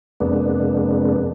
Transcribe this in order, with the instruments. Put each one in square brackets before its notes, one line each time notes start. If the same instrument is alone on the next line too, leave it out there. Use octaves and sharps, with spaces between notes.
[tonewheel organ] F2 C3 G#3 A#3 B3 D4